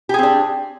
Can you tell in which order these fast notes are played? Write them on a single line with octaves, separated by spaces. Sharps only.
G4 G#4 C4 D4